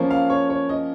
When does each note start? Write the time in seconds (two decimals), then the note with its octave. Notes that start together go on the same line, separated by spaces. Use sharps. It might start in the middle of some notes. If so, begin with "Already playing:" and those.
Already playing: F3 A#3 C#4
0.10 F5
0.30 C#5
0.50 C#5
0.69 D#5